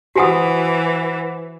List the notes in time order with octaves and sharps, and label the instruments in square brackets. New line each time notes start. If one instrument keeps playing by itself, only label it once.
[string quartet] E3 [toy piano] F#4 G#5 D#6 [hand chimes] C5 F#5